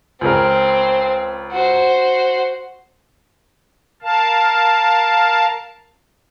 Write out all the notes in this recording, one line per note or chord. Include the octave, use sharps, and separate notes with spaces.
C#2 C4 A#4
F#4 C5
A#4 F5 A5